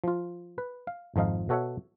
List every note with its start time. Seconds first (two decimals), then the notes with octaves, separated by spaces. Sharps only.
0.04 F3 F4
0.58 B4
0.87 F5
1.16 G#1 F2 F3 D#4 F5
1.49 B2 F#4 A4 C#5 E5 F#5